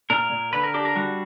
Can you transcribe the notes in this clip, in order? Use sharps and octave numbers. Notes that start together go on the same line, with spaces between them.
A#2 A#4
A#2
D3 B4
A#4
D4 G4
A#4
G3 F#4